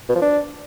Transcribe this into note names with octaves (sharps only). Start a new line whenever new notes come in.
B2
F3
D4